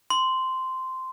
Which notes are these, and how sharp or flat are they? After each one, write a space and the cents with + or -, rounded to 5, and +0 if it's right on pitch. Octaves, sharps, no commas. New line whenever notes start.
C6 -10